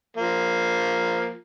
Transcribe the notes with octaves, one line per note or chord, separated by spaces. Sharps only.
F3 A#3